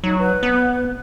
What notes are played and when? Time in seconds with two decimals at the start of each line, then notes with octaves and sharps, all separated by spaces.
0.04 F#3 D#4
0.18 B4
0.43 B3